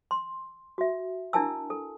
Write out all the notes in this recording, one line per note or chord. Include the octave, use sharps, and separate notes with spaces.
C6
F#4 E5
D4 E4 A#4 G#5 A5 E6
A4